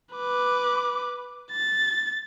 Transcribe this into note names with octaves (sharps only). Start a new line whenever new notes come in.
B4 D6
A6